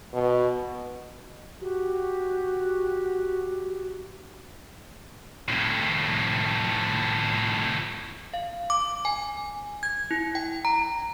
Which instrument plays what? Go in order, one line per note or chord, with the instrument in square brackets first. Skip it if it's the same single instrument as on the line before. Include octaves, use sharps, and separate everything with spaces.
[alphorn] B2
[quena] F#4 [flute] G4
[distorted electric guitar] F2 A2
[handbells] F5
D6
G#5
G#6
E4
G5
A#5